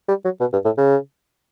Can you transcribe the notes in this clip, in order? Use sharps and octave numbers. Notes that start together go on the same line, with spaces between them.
G3
F#3
B2
G2
A2
C#3